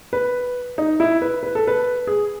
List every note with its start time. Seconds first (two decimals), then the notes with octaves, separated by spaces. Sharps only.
0.13 B4
0.78 D#4
1.00 E4
1.22 B4
1.43 B4
1.55 A4
1.67 B4
2.07 G#4